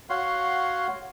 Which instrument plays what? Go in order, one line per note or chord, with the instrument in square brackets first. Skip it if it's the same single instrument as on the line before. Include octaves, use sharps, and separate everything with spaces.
[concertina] F#4 C#5 F5 F#5 C6